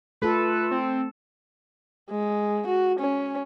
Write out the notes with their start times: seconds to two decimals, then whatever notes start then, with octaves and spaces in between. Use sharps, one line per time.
0.22 A3 F4 A4 B4
0.71 C4
2.10 G#3
2.67 F#4
3.00 C#4